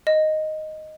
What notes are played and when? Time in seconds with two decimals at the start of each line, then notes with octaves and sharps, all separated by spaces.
0.07 D#5